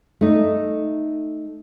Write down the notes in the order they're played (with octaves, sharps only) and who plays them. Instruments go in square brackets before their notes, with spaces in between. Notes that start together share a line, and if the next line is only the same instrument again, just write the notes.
[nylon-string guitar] A3 D#4